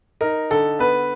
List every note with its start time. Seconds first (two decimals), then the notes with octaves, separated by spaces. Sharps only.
0.21 D#4 A#4
0.50 D3 A4
0.79 B3 B4